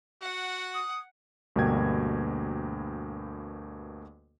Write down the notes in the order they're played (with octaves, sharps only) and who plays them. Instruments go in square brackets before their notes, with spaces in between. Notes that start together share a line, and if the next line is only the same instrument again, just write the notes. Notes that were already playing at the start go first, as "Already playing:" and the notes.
[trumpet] F#4 [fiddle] F#5
[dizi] D#6
[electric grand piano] D2 G2 B2 A#3 G5 G#6